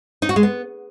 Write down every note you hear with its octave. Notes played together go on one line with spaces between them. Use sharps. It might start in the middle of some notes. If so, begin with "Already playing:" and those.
D#4
F#4
G#3
B3